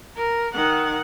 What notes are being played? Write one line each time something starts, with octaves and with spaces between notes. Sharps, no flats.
A#4
D#3 F#5